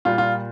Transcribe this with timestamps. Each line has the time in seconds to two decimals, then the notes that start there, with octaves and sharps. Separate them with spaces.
0.05 A#2 G3 F4
0.18 F4